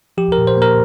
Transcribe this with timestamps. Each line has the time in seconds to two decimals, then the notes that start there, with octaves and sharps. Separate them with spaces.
0.18 F3 G4
0.32 A#4
0.38 A#2
0.47 C5
0.57 A#3 A#4